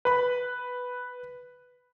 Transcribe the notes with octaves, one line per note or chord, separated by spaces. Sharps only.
B4 B5